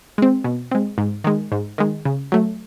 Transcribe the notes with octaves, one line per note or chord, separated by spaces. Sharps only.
G#3 C4
B2
G#3 C4
G#2
D#3 G#3
G#2
D#3 G#3
C#3
F#3 A3